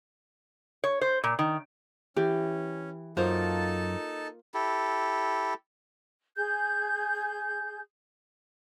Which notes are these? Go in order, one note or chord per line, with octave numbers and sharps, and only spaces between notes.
C#5
C5
A#2
D#3
E3 C#4 G4
F#2 A#3 D#4 F4 A4 C5 A5
E4 G4 A4
G#4 G6